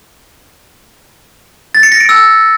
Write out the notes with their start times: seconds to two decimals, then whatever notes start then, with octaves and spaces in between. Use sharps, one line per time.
1.75 A6
1.83 C#7
1.92 A#6
2.00 D7
2.09 E6